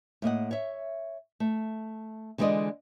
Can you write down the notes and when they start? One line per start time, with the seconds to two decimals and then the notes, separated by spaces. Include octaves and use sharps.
0.22 A2 A#3 D#5 F#5
0.51 C#5 E5
1.40 A3
2.38 D3 E3 G#3 F4 D5 D#5